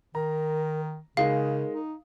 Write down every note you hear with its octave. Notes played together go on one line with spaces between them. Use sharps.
D#3 A#4 A#5
C#3 G#3 D#4 A#4 F5
D#4